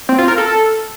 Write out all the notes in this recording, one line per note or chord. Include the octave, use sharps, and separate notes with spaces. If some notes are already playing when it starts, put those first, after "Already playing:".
C4
F4
A#4
A4